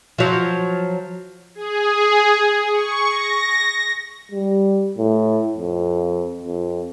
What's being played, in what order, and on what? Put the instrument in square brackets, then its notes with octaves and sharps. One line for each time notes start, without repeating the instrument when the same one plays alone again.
[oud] F3 F#3
[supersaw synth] G#4
C#6
A#6
[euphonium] G3
A2
F2
F2